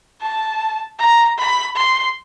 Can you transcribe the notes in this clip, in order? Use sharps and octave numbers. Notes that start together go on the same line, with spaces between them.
A5
A#5
B5
C6